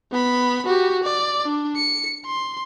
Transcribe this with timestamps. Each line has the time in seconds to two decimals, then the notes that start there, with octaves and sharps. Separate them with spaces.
0.12 B3 B5
0.66 F#4 G4
1.03 D5
1.45 D4
1.76 C#7
2.26 C6